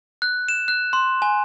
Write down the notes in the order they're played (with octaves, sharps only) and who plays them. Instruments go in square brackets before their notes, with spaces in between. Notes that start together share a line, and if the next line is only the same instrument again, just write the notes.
[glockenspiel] F#6
E7
F#6
C6
G#5